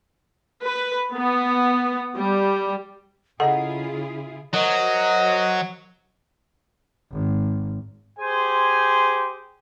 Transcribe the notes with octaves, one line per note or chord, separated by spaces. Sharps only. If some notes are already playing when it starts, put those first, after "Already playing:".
B4
B3
G3
C#3 E4 F4 G#4 A4 D#5 F#5 A#5
F#3 A#4 C5 D#5
G#1
G4 G#4 C5 G#5 C6